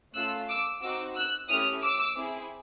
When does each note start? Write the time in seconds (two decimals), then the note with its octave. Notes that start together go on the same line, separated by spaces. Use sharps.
0.14 A3 C#4 F4 A4 E6 F#6
0.49 D6 E6
0.82 C4 D#4 F#4 D6 E6
1.15 E6 F#6
1.49 A3 C#4 E4 G4 D#6 F6
1.82 D6 E6
2.16 C4 E4 G#4